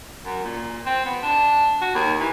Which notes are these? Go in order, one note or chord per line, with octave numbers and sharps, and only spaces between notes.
F#2
A#2
C4
B3
D4
F#4
D#2
E3